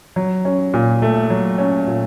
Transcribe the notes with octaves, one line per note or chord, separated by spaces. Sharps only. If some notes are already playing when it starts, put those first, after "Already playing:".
F#3
C#4
A#2
A3
F#3
C#4
A#2